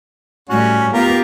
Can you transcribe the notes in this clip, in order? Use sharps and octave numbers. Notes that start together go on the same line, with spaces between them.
A2 G3 C#4 F#4
B3 F4 G4 A#4